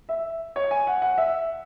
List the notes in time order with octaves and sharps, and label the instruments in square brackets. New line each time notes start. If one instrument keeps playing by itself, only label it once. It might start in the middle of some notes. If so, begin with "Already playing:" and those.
[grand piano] E5
C#5
G#5
F#5
F#5
E5